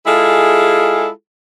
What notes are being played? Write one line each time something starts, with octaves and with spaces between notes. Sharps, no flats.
G#3 E4 F4 G#4 A4